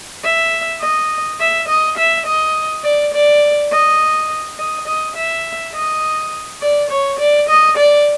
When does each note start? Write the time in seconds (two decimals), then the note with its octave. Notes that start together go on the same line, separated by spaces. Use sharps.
0.24 E5
0.81 D#5
1.40 E5
1.68 D#5
1.98 E5
2.26 D#5
2.84 D5
3.14 D5
3.72 D#5
4.58 D#5
4.87 D#5
5.16 E5
5.74 D#5
6.62 D5
6.90 C#5
7.19 D5
7.49 D#5
7.77 D5